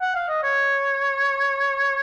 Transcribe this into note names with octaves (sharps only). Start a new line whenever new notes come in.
F#5
F5
D#5
C#5